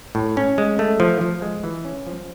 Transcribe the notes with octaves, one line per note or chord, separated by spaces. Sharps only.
A2
C#4
G#3
A3
F3
F3
G#3
E3
C#4
F3